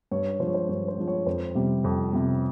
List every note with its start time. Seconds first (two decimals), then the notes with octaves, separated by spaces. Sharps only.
0.11 G2 C#5
0.40 F3 C5
0.43 G#3 C#5
0.55 C5
0.69 G2 C#5
0.88 C5
0.98 F3 G#3
1.08 C#5
1.26 F2 C5
1.55 C3 G3
1.84 F2
2.13 C3 G3